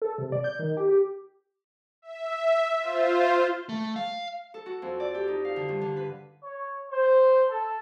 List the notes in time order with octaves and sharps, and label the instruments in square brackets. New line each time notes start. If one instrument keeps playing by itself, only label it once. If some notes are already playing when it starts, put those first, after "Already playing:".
[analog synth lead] A4
C3
D5
G6
D#3
G4
G4
[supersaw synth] E5
F4 C5
[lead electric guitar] A3
F5
[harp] A4
F#4
F2
D5
G4
D#4
F5
D3
G2
D3
B4
[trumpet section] C#5
C5
A4